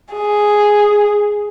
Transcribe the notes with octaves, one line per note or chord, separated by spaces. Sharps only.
G#4